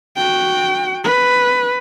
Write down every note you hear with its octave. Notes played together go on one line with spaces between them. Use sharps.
F#4 G5
B4